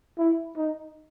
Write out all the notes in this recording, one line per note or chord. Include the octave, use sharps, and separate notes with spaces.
E4
D#4